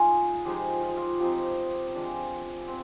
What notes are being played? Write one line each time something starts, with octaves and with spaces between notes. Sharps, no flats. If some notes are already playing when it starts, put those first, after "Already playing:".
Already playing: G#3 D#4 F4 G#4
F3 G#3 D#4 G4
F4
F4
F3 C4 D#4 G4
F3 G#3 D4
C4